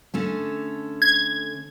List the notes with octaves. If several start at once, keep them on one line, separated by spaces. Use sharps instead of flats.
D3 A3 C#4
G#6